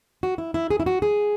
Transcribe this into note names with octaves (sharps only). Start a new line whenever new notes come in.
F#4
E4
E4
G#4
E4
F#4
G#4